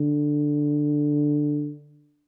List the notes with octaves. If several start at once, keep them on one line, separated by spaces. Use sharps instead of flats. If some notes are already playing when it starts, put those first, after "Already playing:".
Already playing: D3